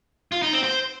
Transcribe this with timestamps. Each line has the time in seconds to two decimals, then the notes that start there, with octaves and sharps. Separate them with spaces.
0.32 F4
0.42 D#4
0.53 C4
0.64 C5